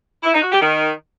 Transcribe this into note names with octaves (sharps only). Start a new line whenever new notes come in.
E4
D#4
F#4
G4
D#3